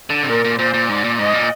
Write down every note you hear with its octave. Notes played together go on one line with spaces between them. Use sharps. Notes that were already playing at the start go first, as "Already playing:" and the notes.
D3
C3
A#2 A#4
A#2
A#2 C5
A#2
G#2 D5
A#2
G#2 D#5
A#2